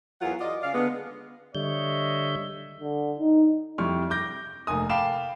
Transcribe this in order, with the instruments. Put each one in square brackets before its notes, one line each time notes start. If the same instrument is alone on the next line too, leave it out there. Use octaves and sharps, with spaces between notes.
[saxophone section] E2 F#3 F4 A#4 F#5
F4 D5 D#5
C#3 D5 F5
D3 G#3 B3
[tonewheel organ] D3 G3 G6 [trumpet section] C#5 D#5 E5
[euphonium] D3
D#4
[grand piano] F2 G3 E4 C#6 F6
D6 G6 A#6
F1 A#3 G#5 D#6
F5 G5 A5 B5 D6 E7